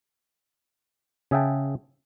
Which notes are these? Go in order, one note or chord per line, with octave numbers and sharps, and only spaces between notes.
C#3 G#4 E5 F#5 G5 A5